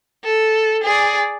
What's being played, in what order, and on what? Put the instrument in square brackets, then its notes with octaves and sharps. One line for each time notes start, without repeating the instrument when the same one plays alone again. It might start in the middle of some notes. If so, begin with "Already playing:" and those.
[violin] A4
G#4 D5